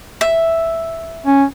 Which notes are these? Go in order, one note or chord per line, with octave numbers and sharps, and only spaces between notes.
E5
C#4